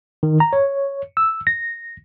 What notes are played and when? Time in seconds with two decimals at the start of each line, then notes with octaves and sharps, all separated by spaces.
0.23 D#3
0.40 A#5
0.53 C#5
1.17 E6
1.47 A#6